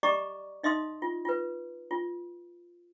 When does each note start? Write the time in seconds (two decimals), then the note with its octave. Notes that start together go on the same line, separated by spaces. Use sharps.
0.03 G4 D5 D#5 A#5 C#6 D6
0.63 D#4 D#5 E5 C6 D#6
1.02 F4
1.25 F4 B4
1.91 F4